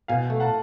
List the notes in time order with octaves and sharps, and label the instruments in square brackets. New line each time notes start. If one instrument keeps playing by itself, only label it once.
[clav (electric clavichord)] B2 [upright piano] F5 G#5
[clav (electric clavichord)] A3
[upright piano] F#5 A5